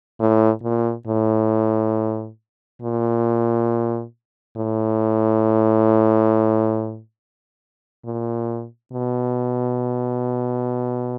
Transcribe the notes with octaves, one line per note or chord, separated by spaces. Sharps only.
A2
A#2
A2
A#2
A2
A#2
B2